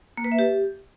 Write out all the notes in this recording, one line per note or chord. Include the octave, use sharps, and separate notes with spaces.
A#3
B4
E5
G4